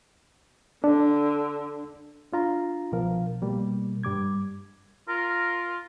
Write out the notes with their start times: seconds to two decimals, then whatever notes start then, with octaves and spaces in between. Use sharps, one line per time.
0.84 D3 D4
2.33 D4 F4 A#5
2.92 C2 B2 F3 A#4 F5
3.42 B2 G3 A#3
4.03 G2 G3 D6 G#6
5.08 F4 A#4